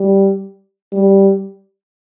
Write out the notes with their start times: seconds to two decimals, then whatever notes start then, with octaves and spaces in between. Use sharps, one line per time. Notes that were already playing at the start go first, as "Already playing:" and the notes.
Already playing: G3
0.93 G3